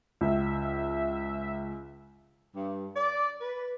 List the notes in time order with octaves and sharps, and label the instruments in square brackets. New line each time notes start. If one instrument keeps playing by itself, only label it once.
[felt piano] C#2 [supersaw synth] E5
[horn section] G2
D5
B4